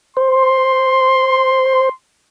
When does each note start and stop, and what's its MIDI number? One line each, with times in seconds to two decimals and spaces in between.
0.17 1.89 72
0.17 1.93 84